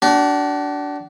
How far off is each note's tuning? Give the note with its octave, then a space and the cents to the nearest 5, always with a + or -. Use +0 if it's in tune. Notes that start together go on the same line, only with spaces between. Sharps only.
D4 -15 F#4 +40